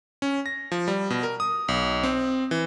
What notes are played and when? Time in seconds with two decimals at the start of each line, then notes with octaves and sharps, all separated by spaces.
0.22 C#4
0.46 A#6
0.72 F3
0.88 G3
1.10 B2
1.23 A#4
1.40 D#6
1.68 B1
2.03 C4
2.51 E3